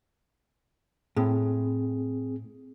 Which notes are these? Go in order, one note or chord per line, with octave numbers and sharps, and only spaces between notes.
A2 C4 G#4